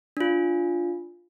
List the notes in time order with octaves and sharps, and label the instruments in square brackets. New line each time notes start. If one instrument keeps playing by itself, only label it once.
[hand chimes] D4 F4